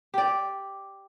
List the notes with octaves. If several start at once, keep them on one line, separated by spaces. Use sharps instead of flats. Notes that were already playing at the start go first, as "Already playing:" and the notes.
G4 D5